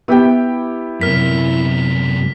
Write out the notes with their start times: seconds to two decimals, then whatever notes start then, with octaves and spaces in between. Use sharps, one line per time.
0.08 B3 E4 G4 G5
1.01 F#2 C3 A#4 F6 B6